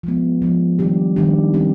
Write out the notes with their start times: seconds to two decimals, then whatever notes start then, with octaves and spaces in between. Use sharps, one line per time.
0.03 F3 G#3 B3
0.42 F3 G#3 B3
0.79 D#3 G3 D4 G4
1.16 D#3 G3 D4 G4
1.54 G3 C4 G4